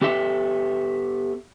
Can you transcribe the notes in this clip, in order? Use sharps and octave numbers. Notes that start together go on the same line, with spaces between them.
B3 G4 A4 B4 E5